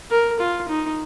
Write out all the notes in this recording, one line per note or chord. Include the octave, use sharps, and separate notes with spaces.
A#4
F4
D#4